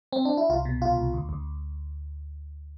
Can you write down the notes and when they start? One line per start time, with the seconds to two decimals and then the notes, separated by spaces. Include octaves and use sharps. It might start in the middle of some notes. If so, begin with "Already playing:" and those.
0.13 C4
0.25 D4
0.37 E4
0.49 C2 F4
0.65 B2
0.82 C2 F4
0.97 C2
1.13 D2
1.29 D2